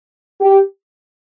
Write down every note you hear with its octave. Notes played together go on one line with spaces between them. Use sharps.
G4